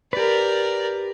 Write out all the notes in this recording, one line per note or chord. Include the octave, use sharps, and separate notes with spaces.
G4 A#4 B4 D5